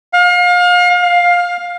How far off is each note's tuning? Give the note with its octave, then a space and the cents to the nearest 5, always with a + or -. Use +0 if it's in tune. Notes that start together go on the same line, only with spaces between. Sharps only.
F5 +35
F5 +15